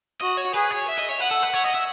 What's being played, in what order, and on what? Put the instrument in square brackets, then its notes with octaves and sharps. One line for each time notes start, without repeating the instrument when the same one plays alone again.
[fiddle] F#4 [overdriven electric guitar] D#5
[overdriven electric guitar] C#5
[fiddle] G#4 [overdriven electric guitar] B4
[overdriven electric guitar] C#5
[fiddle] E5
[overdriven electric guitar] D#5
C#5
[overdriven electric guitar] B4 [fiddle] F#5
[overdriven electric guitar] A4
B4
C#5
D#5
E5